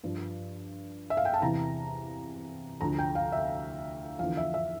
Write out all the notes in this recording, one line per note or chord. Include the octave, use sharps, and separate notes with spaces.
G2 F3
E5
F5
G5
A5
E2 C3 E3 A#5
D2 D3 F3 A#5
G5
F5
E5
E2 D3 F3 F5
E5
E5